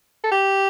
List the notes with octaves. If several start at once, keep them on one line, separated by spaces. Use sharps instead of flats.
A4
G4